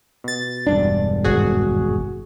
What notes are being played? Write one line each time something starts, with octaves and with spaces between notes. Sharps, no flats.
B2 A6
E1 G2 D4
G#1 F#4 G#4